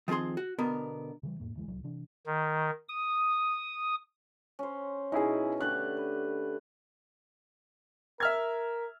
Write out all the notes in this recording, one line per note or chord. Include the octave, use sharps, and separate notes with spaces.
D#3 F3 C4 G#4 C6
F#4
B2 D3 B3 A#4
C#3 E3 G3
F2 A2 A#3
F1 D2 E3 G#3
D1 C2 F#3
C3 E3 D4
D#3
D#6
C#4 C5
B2 C#4 D#4 E4 G#4
D3 A3 G4 F#6
B4
A#4 E5 F6 G#6